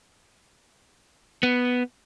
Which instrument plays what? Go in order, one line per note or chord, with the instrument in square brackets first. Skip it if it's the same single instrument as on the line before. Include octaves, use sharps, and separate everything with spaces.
[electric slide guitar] B3